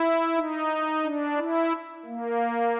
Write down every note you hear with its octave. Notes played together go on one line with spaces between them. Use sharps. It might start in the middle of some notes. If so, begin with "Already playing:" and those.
Already playing: E4
D#4
D4
E4
A#3